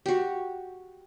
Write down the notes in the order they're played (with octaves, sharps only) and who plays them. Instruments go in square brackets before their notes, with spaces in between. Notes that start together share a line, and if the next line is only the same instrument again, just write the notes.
[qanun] F#4 G4